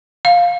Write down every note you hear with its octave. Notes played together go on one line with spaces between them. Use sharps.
F5